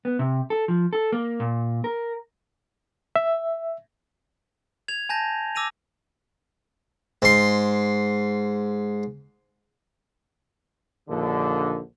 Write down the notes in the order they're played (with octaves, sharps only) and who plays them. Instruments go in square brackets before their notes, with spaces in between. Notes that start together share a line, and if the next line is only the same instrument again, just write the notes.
[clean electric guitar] B3
C3
A4
F3
A4
A#3
A#2
A#4
[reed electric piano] E5
[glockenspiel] G#6 F7
G#5 A5 G6 A#6
D6 E6 A#6 D#7 F7
[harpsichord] G#2 C6
[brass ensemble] A#1 D#2 D3